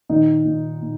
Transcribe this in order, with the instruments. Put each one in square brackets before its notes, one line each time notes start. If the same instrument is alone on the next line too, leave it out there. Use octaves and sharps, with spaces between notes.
[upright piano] A#2 D#3 D#4
A#2
A#2